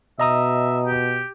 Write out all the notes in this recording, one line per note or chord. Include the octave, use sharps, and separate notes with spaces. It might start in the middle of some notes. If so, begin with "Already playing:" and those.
B2 D#5 E5 A#5 D#6
G4